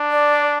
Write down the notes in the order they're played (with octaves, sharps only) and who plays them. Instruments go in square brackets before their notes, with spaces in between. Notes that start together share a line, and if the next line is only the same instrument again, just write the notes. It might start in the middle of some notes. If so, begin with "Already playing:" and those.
Already playing: [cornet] D4
[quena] D5